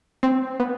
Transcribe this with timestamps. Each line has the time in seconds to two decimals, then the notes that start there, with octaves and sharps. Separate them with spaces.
0.23 C4
0.60 B3